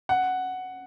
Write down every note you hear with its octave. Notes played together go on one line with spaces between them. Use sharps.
F#5